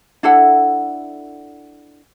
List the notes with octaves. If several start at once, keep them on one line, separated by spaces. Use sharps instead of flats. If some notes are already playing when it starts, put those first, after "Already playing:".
D4 E4 A4 F#5